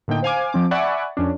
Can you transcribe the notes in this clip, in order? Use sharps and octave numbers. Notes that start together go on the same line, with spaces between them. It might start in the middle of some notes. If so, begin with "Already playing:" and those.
A2 D3 A#3 D#4 G5
C5 F5 G#5 D6
F3 C4 D6
D5 E5 F#5 G#5 B5 C#6
F2 C#4 D4